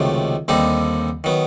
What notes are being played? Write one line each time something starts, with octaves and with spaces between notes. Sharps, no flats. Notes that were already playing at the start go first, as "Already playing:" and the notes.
Already playing: C#2 C3 D#3 F#3 A3
D#2 D3 G3 C4 D#4
D#3 F#3 B3